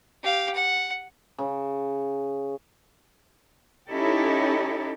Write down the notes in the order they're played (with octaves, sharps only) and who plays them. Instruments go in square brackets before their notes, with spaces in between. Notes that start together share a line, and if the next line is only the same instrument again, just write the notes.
[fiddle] G4 F5
F#5
[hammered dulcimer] C#3
[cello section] C#4 D#4 E4 G4 A4 C#5